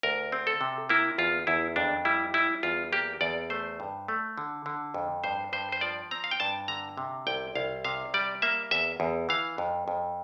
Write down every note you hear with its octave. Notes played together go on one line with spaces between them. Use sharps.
D2 A#4
C4
A4
C3
A#3 E4
E2 F4
E2 E4
F2 D4
G3 E4
G3 E4
E2 F4
A#3 G4
E2 D5
A3 C5
G2
A3
D3
D3
F2
G2 C5
G2 C5
C5
F3 D5
C4 A#5
F5
G5
G2 A5
D3 A#5
C3
C2 G5
C2 F5
C3 F5
G3 D5
A#3 E5
E2 E5
E2
E3 F5
F2
F2